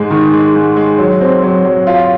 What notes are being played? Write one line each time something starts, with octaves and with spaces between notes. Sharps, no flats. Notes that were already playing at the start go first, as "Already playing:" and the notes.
Already playing: G#2 G#3
D#3
G#3
G#2
G#3
F#3
C4
F#3
F#3
F4